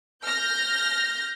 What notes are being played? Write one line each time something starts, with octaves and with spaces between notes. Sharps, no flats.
F6 G6 A#6